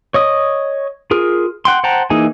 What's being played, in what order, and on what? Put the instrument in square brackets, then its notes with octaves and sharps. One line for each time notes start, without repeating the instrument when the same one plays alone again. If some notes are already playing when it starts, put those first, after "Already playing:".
[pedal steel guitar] C#5 D#5 D#6
F4 G#4 A#4
F#5 G5 C6
C5 F#5 G5 A5 A#5
E3 A#3 D#4 G#4 G#5